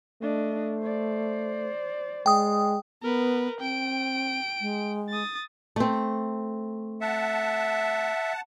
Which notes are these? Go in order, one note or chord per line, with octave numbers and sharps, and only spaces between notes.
A3 D4 D#5
C5 D5
G#3 G5 D#6
B3 A#4 B4
C4 G5 D7
G#3
D#6 A6
A3 C4
E5 F#5 A5